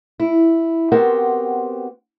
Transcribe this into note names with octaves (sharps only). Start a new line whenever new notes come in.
E4
B3 C4 F#4 G4 A#4 C5